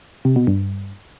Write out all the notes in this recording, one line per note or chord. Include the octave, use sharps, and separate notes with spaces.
C3
B2
G2